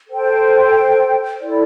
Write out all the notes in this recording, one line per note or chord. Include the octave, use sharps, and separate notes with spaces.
A4 C5 G5
E4 A4 D5